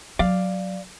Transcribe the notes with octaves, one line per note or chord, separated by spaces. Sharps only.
F#3 D5 F5